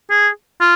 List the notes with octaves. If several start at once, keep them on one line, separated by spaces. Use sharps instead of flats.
G#4
F4